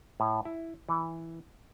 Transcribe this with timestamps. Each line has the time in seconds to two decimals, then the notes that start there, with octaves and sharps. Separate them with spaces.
0.20 A2
0.45 E4
0.89 E3